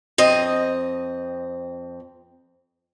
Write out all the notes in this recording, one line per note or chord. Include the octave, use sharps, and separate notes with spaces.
F2 C4 D#5